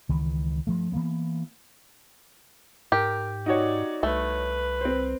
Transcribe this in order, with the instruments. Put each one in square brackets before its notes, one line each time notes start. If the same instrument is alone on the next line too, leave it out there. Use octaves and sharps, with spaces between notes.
[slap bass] C#2 D#3 E3
G2 F3 A3
E3 F#3 A#3 B3
[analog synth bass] G#2 [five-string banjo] G4 [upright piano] A#4
[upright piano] D#4 F#4 C#5 [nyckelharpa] D5
[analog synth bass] C2 [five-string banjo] A3 [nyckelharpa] B4
[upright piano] C4 C5